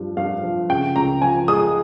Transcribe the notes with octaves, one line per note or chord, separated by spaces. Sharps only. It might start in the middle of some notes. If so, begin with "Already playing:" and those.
Already playing: G2 F3
G2 F5
F3
C#3 G5
C#2 A#5
F3 G#5
G#3 D#6